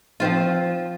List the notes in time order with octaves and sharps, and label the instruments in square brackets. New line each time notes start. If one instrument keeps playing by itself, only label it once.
[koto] F3 C4 F4